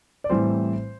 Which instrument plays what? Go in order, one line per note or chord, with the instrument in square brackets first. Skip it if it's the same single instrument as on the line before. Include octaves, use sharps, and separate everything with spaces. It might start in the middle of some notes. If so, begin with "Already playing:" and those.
[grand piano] D5
A2 E3 G3 C4 C5